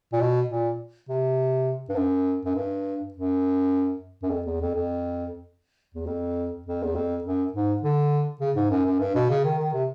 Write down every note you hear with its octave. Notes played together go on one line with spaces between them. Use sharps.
A#2
B2
A#2
C3
G2
F#2
F#2
G2
F#2
F#2
F2
E2
F2
F2
E2
F2
F2
E2
F2
F#2
G#2
D3
C#3
G#2
F#2
F#2
G2
B2
C#3
D#3
D#3
C3